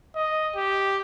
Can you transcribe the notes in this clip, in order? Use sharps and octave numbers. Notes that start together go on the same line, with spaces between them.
D#5
G4